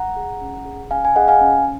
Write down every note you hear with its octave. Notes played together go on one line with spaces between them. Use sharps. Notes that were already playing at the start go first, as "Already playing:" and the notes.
Already playing: F#5 A#5
G#4
C#4
G#4
C#4 F5 G#5
G#5
G#4 D#5 F#5
F5 G#5
C#4